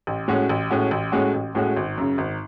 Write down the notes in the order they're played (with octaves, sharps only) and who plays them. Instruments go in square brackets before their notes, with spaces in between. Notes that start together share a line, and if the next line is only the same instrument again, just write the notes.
[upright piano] A1
A2 G#3 C#4 F#4
A1
A2 G#3 C#4 F#4
A1
A2 G#3 C#4 F#4
A1
A2 G#3 C#4 F#4
G#1
F#2 C#3
G#1